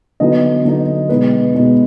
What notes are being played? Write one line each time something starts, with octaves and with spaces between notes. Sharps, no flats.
D3 F#3 B3 D#4 D#5
D3 F#3 B3 D#4
B2 G#3 B3 D#4 B4
B2 G#3 B3 D#4